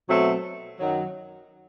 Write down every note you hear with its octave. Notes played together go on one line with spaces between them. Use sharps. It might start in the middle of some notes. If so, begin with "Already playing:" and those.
B2 F#3 A3 C4
F#2 D#3 F#3